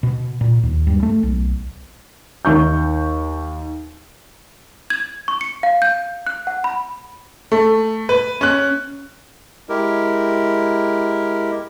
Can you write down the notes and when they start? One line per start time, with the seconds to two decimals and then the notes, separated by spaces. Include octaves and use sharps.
0.03 B2
0.41 A#2
0.63 D#2
0.87 G2
1.03 A3
1.23 B1
2.45 D#2 C#6 G6
4.90 G#6
5.28 C#6
5.41 C#7
5.63 F5
5.82 G6
6.26 F#6
6.47 F#5
6.64 B5
7.52 A3
8.09 B4
8.41 C#4 F#6
9.69 G#3 E4 G4 A#4